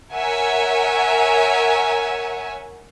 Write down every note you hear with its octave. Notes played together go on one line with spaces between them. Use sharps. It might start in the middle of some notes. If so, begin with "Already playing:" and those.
A#4 C#5 E5 F#5 G#5